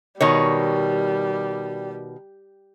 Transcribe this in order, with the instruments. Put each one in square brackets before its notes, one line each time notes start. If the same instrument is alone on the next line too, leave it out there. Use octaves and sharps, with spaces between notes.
[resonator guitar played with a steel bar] B2 D#3 C#5 [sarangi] G3